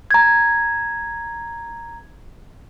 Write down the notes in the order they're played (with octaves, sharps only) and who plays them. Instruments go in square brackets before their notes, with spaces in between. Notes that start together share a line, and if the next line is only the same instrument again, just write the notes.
[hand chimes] A#5 G#6